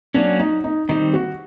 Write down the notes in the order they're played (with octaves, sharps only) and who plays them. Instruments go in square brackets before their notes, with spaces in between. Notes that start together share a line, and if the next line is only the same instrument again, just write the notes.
[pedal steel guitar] F#3 A#3 C#4 [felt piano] D4
[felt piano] D#4
D#4
[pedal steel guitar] D#3 G3 C4 [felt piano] D#4
[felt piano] F#4